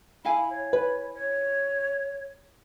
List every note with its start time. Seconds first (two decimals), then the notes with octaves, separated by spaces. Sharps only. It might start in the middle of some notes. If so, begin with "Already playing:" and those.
0.25 E4 F5 G#5 B5
0.50 C#5
0.73 B4
1.14 C#5